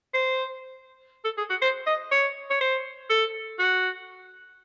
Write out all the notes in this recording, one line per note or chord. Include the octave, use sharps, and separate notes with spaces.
C5
A4
G#4
F#4
C5
D#5
C#5
C#5
C5
A4
F#4